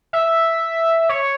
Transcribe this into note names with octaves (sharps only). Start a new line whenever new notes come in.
E5
C#5